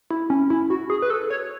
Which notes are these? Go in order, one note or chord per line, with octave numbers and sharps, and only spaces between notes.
E4
C#4
E4
F#4
G#4
B4
A4
C#5